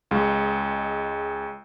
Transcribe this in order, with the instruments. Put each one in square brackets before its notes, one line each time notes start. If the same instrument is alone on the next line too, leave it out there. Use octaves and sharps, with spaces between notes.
[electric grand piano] C#2 G#3